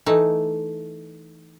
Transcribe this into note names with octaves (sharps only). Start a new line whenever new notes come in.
E3 A3 D#4